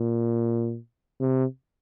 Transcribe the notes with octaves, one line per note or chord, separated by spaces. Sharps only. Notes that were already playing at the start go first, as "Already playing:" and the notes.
Already playing: A#2
C3